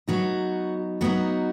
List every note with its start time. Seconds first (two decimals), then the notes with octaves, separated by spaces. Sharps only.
0.08 F#3 B3 D#4 F#4
1.01 F#3 B3 D#4 F#4